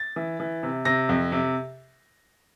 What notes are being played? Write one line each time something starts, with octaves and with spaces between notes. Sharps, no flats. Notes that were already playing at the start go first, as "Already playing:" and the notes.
Already playing: A6
E3
E3
C3
C3 A#6
F2
C3